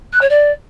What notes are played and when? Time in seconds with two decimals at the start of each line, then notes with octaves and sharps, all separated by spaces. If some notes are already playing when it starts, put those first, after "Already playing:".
0.13 F#6
0.21 C#5
0.29 D5